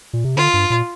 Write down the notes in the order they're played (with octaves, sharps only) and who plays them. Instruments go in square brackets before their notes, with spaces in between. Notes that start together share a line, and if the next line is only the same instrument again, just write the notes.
[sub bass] A#2
C3
[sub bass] D3 [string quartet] F4
[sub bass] G2
A#2